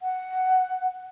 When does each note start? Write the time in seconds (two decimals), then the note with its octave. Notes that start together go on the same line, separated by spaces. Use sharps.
0.01 F#5